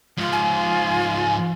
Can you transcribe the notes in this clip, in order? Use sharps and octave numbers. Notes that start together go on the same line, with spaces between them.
G#2 F3 F4
G#5